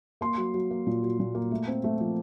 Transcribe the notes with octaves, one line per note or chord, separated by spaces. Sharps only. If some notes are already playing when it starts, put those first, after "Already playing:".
A#3 C6
F#3
F#3
A#3
A#2
F#3
A#2
A#3
A3
C4
A3
F3